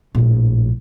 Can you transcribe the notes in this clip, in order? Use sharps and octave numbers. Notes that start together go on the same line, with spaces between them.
A#1 A2